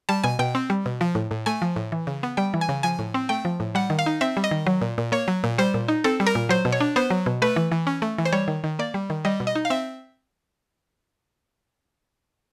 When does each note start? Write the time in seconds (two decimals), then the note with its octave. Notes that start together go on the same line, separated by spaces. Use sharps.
0.09 G3 A5
0.24 B2 G#5
0.39 B2 G5
0.55 C4
0.70 G3
0.86 B2
1.01 F3
1.15 A2
1.31 A2
1.46 A3 G#5
1.62 F3
1.76 A2
1.92 E3
2.07 C#3
2.23 B3
2.37 G3 G5
2.54 E3
2.61 G#5
2.69 C#3
2.83 F3 G#5
2.99 A2
3.14 C4
3.29 A3 G5
3.45 F3
3.60 A2
3.75 G3 F#5
3.90 D#3
3.99 F5
4.06 D#4
4.21 C4 E5
4.37 G3
4.44 D#5
4.51 D#3
4.67 F#3
4.81 A#2
4.98 A#2
5.12 A#3 C#5
5.28 F#3
5.44 A#2
5.58 G3 C5
5.74 A#2
5.88 D#4
6.04 C4 A4
6.20 G3
6.27 A#4
6.35 A#2
6.49 F#3 C5
6.65 B2
6.72 C#5
6.80 D4
6.96 B3 C5
7.10 F#3
7.26 B2
7.42 A3 B4
7.56 E3
7.72 E3
7.87 C#4
8.02 A3
8.18 E3
8.25 C5
8.33 G3 C#5
8.48 D#3
8.64 D#3
8.79 A#3 D5
8.94 G3
9.10 D#3
9.25 G3 D#5
9.40 B2
9.47 D#5
9.55 D#4
9.65 F5
9.70 C4 E5